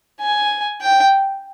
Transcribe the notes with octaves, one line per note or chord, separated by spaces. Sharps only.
G#5
G5